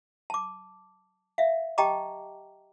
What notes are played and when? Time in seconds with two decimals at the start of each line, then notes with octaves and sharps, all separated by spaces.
0.30 A5 D6
1.38 E5 F5
1.78 G4 D#5 G5 A5 A#5 D6